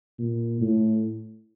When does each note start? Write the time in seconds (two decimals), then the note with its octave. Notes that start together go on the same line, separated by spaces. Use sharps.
0.19 A#2
0.60 A2